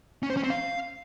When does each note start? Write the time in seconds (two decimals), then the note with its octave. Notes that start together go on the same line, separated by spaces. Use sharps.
0.23 C#4
0.30 C5
0.37 C#4
0.43 C4
0.50 F5